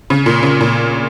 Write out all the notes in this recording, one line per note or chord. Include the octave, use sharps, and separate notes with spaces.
C#3
A#2
C#3
A#2